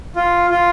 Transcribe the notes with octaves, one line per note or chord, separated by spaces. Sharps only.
F4
F4